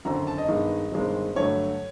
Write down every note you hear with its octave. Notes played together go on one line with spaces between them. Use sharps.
G#1 F#2 D3 A#5
A5
D#5
G2 D#3 G#3 B3 D#4
G1 G2 D#3 G#3 C4
G2 D3 F#3 A3 C#5